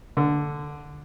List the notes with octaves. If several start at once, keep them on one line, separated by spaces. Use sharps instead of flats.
D3